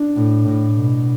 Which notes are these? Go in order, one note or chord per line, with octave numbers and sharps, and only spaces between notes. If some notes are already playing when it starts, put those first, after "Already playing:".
Already playing: D4
A2
A2
B2